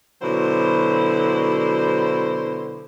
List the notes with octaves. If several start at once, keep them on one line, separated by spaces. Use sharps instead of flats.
B2 D3 F#3 E4 C5